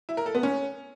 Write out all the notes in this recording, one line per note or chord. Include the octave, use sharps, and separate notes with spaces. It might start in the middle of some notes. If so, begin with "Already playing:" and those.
E4
A#4
A4
B3
C#4